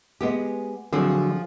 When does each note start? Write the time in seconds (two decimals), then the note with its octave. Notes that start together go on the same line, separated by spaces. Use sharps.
0.21 G#3 B3 G4
0.92 D3 F3 F#3 C4 G#4